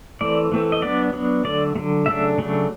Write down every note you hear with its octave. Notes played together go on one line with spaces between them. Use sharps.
E3 A3 C4 D5
E3 A3 C4
D#5
F#3 B3 D4 D5
F#3 B3 D4
D3 F#3 A3 D5
D3 F#3 A3
C#3 F#3 A3 D4 E5
C#3 F#3 A3 D4